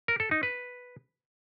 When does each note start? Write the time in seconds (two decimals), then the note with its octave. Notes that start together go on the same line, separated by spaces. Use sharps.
0.08 A#4
0.20 A4
0.31 D#4
0.43 B4